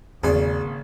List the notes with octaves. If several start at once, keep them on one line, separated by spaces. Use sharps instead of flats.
G#1 E2 C#3 A#3 G#4 D5